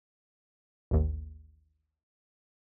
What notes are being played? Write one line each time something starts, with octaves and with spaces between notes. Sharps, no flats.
A1 D#2